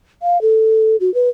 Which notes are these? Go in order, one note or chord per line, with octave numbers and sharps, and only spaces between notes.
F5
A4
F#4
B4